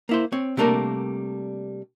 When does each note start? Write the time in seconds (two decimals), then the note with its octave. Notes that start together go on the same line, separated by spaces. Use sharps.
0.09 A#3 E4 C5
0.32 C4 C#5
0.57 C3 G3 A3 A#3 D4 A#4